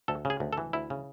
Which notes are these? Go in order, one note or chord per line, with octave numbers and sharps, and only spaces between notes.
D2 A4
C#3
G#4
D2
A4
E3
D2 E4
C#3